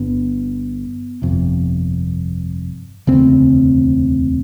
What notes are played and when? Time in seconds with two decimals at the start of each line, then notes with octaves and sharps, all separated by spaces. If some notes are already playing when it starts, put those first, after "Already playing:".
Already playing: G1 D3 B3
1.22 G1 F2 C3
3.07 E1 D2 C#3 C4